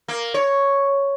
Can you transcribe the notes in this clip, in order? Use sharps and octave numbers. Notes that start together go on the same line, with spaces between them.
A#3
C#5